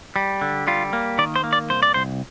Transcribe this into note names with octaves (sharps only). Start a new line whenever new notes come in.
G3
D3
G3 F4
A#3
D#3 D5
C5
A#3
D5
C2 C5
D5
C2 C5